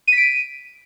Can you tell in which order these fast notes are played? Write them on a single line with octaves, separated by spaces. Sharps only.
D#7 B6 D7